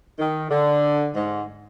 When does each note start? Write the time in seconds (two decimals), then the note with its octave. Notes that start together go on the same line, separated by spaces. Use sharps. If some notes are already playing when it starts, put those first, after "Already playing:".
0.19 D#3
0.51 D3
1.15 G#2